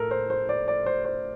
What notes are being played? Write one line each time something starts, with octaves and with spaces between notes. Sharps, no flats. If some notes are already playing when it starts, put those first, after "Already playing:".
Already playing: A2 A4 A#4
C5
C5
D5
D5
C5
C5